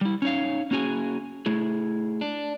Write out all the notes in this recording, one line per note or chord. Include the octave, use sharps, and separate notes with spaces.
G3 E4
C#4 D#4 C#5 F5
A#3 C#4 F#4 G#4 G#5
A3 E4 G#4
D4